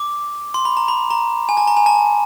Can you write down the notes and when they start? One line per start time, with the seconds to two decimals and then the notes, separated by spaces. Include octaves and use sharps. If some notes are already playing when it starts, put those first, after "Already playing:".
Already playing: D6
0.54 C6
0.65 B5
0.77 A#5
0.88 B5
1.10 A#5
1.49 G#5
1.57 A5
1.67 A#5
1.77 G#5
1.86 A5